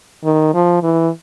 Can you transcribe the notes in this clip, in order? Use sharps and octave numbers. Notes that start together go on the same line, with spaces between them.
D#3
F3
E3